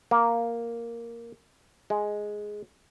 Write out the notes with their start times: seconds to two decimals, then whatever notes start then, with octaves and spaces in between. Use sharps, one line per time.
0.11 A#3
1.90 G#3